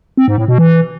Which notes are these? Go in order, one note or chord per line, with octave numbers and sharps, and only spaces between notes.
C4
G#2
A2
B2
E3